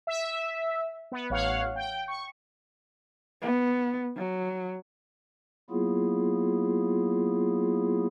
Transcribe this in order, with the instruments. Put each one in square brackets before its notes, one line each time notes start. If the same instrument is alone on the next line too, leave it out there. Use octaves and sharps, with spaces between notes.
[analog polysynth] E5
B3
A1 C#5 F5 F#5
G5
C#6
[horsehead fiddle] B3
F#3
[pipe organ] F#3 A#3 B3 E4 F4 G#4